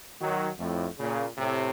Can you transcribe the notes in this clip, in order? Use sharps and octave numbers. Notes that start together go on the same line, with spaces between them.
D#3 F#3
F2 A2
A#2 C#3
A2 C3